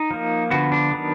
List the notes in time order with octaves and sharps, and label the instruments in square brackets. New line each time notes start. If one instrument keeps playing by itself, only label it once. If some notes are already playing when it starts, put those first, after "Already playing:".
Already playing: [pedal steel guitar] D#4
F3 A#3
D3 F3 B3 F#4
D4
D#3 F#3 B3